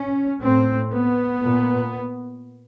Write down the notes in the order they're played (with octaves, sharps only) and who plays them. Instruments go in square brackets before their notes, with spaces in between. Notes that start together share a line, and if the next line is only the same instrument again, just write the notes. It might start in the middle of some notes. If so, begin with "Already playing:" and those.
Already playing: [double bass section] C#4
A2 C4
B3
A#2